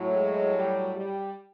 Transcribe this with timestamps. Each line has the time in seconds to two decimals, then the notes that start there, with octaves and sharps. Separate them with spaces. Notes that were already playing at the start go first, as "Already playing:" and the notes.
Already playing: A2 F#3
0.11 G#3
0.52 G3
0.94 G3